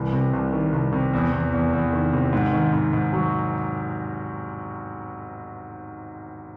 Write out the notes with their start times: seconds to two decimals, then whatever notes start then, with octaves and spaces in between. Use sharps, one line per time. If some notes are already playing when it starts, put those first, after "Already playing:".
Already playing: C2 E3
0.13 C3
0.33 C2
0.53 D#3
0.73 C2
0.93 C3
1.13 E2
1.32 E2
1.53 E2
1.73 E2
1.93 D#3
2.13 C3
2.33 G#2
2.53 D#3
2.73 G#2
2.93 G#2
3.13 F#3